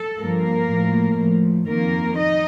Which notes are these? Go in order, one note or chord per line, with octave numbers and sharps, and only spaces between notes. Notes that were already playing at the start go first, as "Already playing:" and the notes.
Already playing: A4
G2 F3 A#3 A#4
A2 F3
A2 F3
F2 D#3 A#3 A#4
D#4 D#5